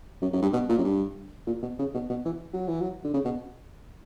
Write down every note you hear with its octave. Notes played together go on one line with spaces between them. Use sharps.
F#2
F#2
G2
B2
A#2
F#2
G2
A#2
B2
C#3
B2
B2
E3
F#3
E3
F#3
D3
C#3
B2